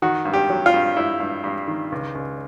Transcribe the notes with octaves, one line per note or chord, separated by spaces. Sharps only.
D#3 F#4
G2
G4
F#3
F4
G2
G2 E4
G2
G2
D#3
C#2
C#2